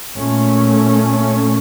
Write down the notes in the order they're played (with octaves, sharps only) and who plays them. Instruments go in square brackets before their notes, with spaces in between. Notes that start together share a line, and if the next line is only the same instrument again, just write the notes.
[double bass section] A#2 A3 C#4